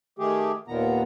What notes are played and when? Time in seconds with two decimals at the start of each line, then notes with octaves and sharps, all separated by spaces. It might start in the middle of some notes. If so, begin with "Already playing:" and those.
0.19 D#3 A3 G4 G#4
0.68 D#2 A#2 D#3 B3 A#5